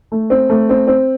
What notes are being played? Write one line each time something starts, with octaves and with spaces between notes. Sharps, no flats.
A3
C4
A3
C4
C4